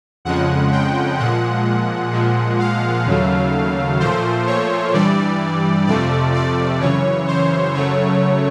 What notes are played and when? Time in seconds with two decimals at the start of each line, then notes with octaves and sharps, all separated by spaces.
0.25 F2 C#3 F3 G#3 F#5
0.72 G5
1.19 A#2 F3 G#3 F#5
2.12 A#2 F3 G#3
2.60 F5
3.06 D#2 C#3 F#3 A3
3.99 A#2 F3 A3 C5
4.47 C#5
4.93 G2 E3 G3 D5
5.87 F2 C3 F3 A3 D5
6.34 D5
6.81 F#2 C#3 E3 C#5
7.27 C5
7.74 F#2 C#3 F#3 A3 C#5